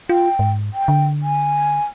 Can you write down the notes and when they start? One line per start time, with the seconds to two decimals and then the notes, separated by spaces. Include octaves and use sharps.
0.09 F4 G5
0.39 G#2
0.74 G5
0.88 D3
1.22 G#5